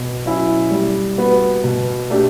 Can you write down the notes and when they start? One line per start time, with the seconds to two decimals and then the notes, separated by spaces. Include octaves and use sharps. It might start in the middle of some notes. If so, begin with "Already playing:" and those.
Already playing: B2
0.25 F#3 C#4 E4
0.71 G3
1.18 B3 F#4
1.64 B2
2.10 A3 D4 G4